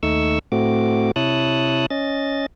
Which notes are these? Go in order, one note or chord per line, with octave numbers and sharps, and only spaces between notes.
D#2 A3 D#4 C#6 E6
A2 A3 C4 F#4 D6
C3 E4 C#5 A5 D#6 F#6
C#4 D#5 A6